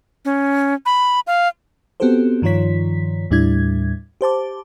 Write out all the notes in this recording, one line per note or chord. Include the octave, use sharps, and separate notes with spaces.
C#4
B5
F5
B3 C4 F#4 G4 A4 C5
G2 D#3 F3 F4 C#5 B6
D#2 A2 G3 D4 E4 G#6
G4 C5 A5 D6